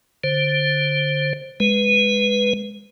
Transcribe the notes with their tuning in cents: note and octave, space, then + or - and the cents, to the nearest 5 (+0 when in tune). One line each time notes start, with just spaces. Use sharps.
D3 +0 C5 +15
G#3 -10 B4 +0